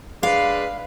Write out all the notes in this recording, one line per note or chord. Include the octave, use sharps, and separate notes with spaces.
G#3 D4 B4 F5